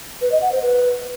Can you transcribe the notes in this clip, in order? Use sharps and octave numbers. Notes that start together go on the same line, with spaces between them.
B4
D#5
F#5
C5
B4